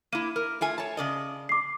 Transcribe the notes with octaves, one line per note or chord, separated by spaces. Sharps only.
A#3 E4 D#7
A#4
A3 F4 G#5
C#5 A5
C#3 D5 D#5
D6 C7